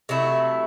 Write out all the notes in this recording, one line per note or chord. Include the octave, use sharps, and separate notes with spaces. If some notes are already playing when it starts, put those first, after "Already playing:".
C3 F#3 A3 E4